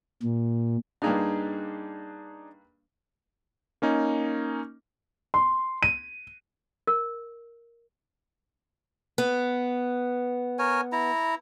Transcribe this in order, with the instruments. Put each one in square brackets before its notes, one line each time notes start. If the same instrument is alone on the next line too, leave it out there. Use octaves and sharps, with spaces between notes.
[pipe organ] A#2
[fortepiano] G2 A#3 F5 [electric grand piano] D4 D#4 G#4
[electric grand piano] A#3 C#4 D#4
[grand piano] C6
D#7
[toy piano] A#4
[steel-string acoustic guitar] B3
[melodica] A#4 C#5 G#5
E4 A#5